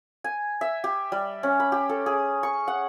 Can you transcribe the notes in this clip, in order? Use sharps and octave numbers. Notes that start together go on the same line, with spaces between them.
G#5
E5
G4
G3
C#4
B5
G4
A4
G#4
C#6
F#5